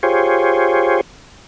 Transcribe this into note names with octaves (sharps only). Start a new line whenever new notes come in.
F4 G4 G#4 C5 C#5